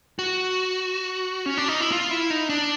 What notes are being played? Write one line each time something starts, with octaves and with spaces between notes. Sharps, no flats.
F#4
C#4
D4
D#4
E4
F4
E4
D#4
D4